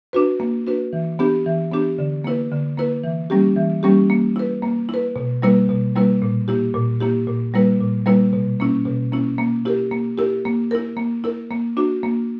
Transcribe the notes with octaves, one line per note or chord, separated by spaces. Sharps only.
D4 F#4 B4
A#3
D4 F#4 B4
E3
B3 D4 G4
E3
B3 D4 G4
D3
A#3 E4 B4
D3
A#3 E4 B4
E3
G3 A#3 C#4 G4
E3
G3 A#3 C#4 G4
A#3
E4 B4
A#3
E4 B4
B2
G3 A#3 E4 B4
B2
G3 A#3 E4 B4
A#2
A#3 E4 G4
A#2
A#3 E4 G4
A#2
G3 A#3 E4 B4
A#2
G3 A#3 E4 B4
B2
A#3 C#4 E4
B2
A#3 C#4 E4
A#3
E4 G4 A#4
A#3
E4 G4 A#4
A#3
E4 A#4
A#3
E4 A#4
A#3
D4 F#4
A#3